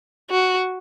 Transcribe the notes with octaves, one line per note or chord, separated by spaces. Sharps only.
F#4